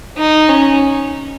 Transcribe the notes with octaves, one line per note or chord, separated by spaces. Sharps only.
D#4
C#4